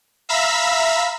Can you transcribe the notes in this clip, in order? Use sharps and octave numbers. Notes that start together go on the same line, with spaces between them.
E5 F5 A#5 B5 E6 B6